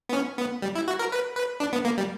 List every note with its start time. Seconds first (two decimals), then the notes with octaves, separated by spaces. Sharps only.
0.09 B3
0.13 C#4
0.38 B3
0.62 G3
0.75 E4
0.88 F#4
0.99 A#4
1.12 B4
1.36 B4
1.60 D4
1.73 B3
1.85 A#3
1.98 G3